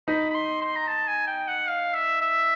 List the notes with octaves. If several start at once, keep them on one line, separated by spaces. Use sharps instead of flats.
D#4 B5
B5
C6
C6
A#5
A5
G#5
G5
F#5
F5
E5
E5